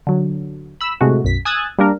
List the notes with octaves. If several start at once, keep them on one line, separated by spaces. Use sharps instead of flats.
D3 F#3
B5 E6
A2 C3 G#3 A3 F#4
B1 F#2 B6
G#5 D#6 E6 F#6 G#6 A6
G3 A#3 D4 A#4